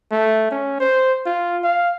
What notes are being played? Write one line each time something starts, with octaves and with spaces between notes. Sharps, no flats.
A3
C#4
C5
F4
F5